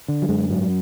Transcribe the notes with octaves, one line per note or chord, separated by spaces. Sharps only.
D3
F#3
F#2 G#3
G#2 F#3